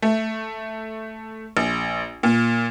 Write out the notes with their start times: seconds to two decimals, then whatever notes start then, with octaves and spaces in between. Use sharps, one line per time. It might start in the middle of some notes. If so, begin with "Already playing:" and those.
0.02 A3
1.57 A#1
2.23 A#2